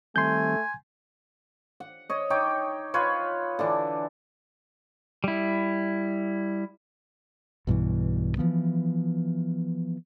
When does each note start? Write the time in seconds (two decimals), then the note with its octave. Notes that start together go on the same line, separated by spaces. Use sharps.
0.16 D#3 G3 A3 C4 G#5 C6 G6
1.80 F#5
2.09 C#5 D#5
2.30 D#4 C#5 G5 D6
2.94 F4 B4 C#5
3.59 D3 E3 D4
5.24 G3 E4
7.67 B1 G2 B2 E3
8.38 E3 F3 B3